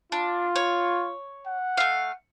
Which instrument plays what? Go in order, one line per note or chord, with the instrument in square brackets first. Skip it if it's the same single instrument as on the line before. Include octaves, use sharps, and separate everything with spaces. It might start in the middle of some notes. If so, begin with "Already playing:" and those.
[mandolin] D4 [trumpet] F4
[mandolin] C#5
[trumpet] F#5
[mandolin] A3 F5